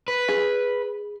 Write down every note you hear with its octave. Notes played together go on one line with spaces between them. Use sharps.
B4
G#4